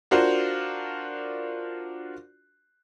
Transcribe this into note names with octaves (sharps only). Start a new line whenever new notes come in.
D4 F4 F#4 A#4 C5